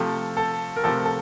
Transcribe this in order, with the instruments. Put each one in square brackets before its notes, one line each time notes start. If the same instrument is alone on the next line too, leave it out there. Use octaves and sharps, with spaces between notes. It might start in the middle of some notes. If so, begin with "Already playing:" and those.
Already playing: [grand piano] C3 F3 A3 A4
A4
A#4
C3 F3 A3 A4
A4